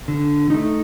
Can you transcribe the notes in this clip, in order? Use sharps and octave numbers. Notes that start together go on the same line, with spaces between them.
D3
A3 D#4